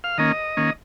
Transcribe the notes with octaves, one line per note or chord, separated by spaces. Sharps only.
F5
D#3 A#3 C#4 D#5
D#3 A#3 C#4